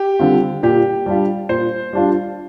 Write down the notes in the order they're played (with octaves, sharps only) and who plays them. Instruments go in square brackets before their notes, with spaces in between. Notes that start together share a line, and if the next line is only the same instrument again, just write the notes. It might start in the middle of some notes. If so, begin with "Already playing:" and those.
Already playing: [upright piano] G4
[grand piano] D3 G3 C4 F4
[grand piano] A#2 [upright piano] G4
[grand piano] G3 D4 F4
[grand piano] A#2 [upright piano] C5
[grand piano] G3 D4 F4